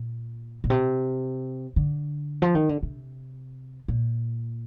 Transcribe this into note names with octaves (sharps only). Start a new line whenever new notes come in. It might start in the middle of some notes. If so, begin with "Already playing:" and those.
Already playing: A#2
A#2
C3
D3
F3
D#3
D3
C3
A#2